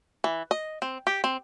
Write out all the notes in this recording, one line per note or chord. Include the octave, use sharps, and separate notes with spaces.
E3
D#5
C4
G4
C4